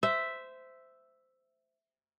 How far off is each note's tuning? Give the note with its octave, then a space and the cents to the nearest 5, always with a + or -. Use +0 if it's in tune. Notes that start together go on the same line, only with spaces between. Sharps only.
C5 -15 E5 +0